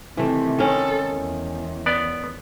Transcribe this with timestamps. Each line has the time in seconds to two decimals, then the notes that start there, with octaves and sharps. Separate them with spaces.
0.17 C3 D#3 E3 A3
0.59 D#3 G#3 C#4 A4
1.09 E2
1.86 B3 D5